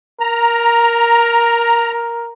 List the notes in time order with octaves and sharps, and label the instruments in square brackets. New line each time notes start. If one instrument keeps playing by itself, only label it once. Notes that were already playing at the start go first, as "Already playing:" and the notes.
[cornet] A#4 [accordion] A#5